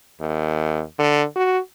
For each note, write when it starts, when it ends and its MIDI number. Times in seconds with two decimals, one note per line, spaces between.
0.21 0.82 39
0.99 1.25 50
1.36 1.59 66